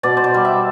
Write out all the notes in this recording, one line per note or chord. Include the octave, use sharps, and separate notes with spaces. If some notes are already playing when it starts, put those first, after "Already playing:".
B2 D5
C5
D5
G3
E5